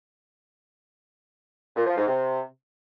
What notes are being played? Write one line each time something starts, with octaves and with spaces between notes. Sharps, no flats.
A#2
F3
G#2
C3